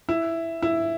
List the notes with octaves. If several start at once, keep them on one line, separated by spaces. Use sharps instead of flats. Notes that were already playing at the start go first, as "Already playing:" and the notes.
E4
E4